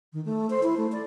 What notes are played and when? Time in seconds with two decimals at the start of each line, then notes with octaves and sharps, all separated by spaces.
0.13 D#3
0.25 A3
0.50 C5
0.63 E4
0.77 A3
0.92 D5